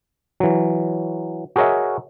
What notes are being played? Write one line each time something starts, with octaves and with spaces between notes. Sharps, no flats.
E3 F#3
F#4 G#4 A#4 C#5 D#5 E5